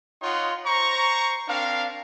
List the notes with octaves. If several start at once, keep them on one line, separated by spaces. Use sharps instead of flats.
D#4 F4 C#5 D#5 F#5 C6
C5 A#5 C#6
C4 D4 A#4 F5